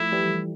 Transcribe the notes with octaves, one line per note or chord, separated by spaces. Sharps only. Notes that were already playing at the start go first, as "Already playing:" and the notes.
Already playing: F3 A3 E4
E3 G3